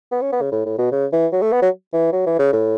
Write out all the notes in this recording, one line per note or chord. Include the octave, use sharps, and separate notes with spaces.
B3
C#4
B3
C#3
A2
A2
B2
C#3
E3
F#3
A3
B3
F#3
E3
F#3
E3
C#3
A2